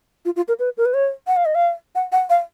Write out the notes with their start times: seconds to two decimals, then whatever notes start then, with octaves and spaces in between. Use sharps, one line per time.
0.25 F4
0.36 F4
0.48 A#4
0.59 B4
0.77 A#4
0.85 B4
0.94 C#5
1.27 F#5
1.37 F5
1.45 D#5
1.55 F5
1.95 F#5
2.12 F#5
2.30 F5